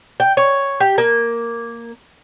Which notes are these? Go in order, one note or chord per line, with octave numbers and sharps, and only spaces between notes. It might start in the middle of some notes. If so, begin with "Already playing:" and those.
G5
C#5
G4
A#3